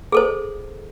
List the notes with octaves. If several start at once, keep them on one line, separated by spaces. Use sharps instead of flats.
G#4 A4 C5